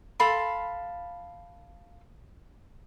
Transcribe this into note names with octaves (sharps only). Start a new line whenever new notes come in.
A4 F5 B5 C6